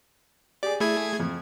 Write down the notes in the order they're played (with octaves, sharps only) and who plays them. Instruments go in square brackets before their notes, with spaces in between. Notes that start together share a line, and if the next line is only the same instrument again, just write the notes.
[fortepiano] G4 G#4 [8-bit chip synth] D5
[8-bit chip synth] A3 G#4 G#6 [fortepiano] E4
[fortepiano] F2